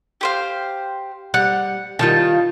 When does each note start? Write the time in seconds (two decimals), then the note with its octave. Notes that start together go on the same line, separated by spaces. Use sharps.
0.21 G4 C5 F5
1.34 G3 F#5
1.99 D#3 G3 F4 A5